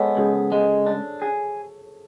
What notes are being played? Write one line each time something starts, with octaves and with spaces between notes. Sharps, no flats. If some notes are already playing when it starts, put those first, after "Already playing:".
Already playing: G#3 B3 A4 C#5
C#2 G#4
G#3
D4
G#4